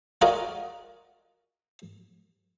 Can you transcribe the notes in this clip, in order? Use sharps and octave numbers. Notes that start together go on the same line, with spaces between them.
F4 F#4 G#4 A#4 D5 D#5